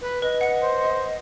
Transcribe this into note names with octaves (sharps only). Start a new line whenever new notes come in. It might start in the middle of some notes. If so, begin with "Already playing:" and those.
B4
B4 D#5
F#5 C#7
C5